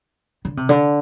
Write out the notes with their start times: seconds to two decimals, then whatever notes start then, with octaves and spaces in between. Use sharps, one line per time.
0.45 D3
0.57 C3
0.69 D3